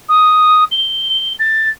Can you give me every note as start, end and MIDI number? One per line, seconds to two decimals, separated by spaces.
0.09 0.64 87
0.72 1.33 103
1.39 1.69 93